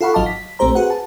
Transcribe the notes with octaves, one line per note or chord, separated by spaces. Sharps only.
F4 A4 F5 F#5 B5 C#6
G#1 F#3 D#5 F5 A5 D6
B6
A#1 A3 C4 G4 C5 A#5
F#4 G#4 B4 F#5
A5